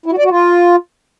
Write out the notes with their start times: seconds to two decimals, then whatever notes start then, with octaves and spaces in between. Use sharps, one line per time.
0.06 E4
0.12 F#4
0.18 D5
0.24 F#4
0.30 F4